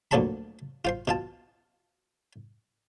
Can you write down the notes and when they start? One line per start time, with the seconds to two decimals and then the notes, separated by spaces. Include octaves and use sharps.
0.11 D2 A#2 F3 F#3 A5 B5
0.85 F4 C5 C6
1.08 B2 F4 A5